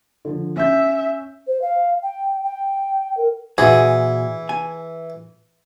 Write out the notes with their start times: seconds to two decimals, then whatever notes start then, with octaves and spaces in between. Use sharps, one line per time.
0.25 D3 F3
0.56 C#4 E5 G6
1.47 C5
1.61 F5
2.03 G5
2.44 G5
3.17 A#4
3.58 A#2 E3 F#4 G#4 G#5
4.49 G#5